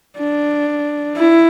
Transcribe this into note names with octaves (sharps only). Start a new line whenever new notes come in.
D4
E4